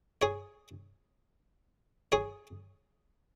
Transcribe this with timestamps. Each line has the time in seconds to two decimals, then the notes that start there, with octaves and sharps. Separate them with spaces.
0.22 G#4 C#5
2.12 G#4 C#5